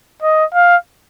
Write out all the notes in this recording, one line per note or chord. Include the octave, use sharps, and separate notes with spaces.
D#5
F5